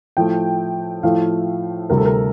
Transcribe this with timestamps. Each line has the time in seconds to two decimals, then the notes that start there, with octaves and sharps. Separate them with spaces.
0.17 A2 F3 A3 G5
1.03 A2 F3 A3 F5
1.90 D2 C3 G3 A#4
1.98 A4
2.06 A#4